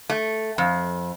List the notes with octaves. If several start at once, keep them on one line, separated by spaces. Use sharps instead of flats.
A3
F2